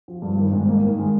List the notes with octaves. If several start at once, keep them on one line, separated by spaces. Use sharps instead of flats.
F3
G2
D#3
G#2
A#3
D#3
G#3